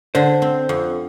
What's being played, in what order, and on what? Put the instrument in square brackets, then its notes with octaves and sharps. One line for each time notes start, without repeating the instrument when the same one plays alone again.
[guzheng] D3 [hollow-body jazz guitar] C5
[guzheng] C4
F2